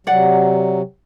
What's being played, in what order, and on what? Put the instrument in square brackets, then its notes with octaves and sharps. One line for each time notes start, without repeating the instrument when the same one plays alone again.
[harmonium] C3 F#3 [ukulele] D5 F#5